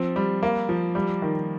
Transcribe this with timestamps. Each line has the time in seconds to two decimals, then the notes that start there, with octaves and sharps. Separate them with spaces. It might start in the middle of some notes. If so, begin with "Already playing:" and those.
Already playing: F3 C4
0.16 G3
0.43 A#3
0.69 F3
0.95 G3
1.22 D#3